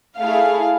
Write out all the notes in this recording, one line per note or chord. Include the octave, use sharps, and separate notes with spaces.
A3 E4 G#4 F5